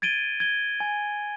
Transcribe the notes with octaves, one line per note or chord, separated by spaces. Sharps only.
G#6 A6 D7 D#7 G7
G#6 G7
G#5